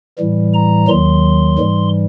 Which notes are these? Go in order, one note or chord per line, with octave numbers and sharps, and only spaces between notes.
A2 E3 G3
A#5
D#2 D#3 F#3 C6
G#2 E3 G3